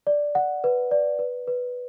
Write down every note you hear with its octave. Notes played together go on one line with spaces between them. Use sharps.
D5
F#5
B4
D5
B4
B4